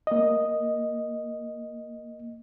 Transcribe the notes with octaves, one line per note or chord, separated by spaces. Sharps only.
A#3 D#5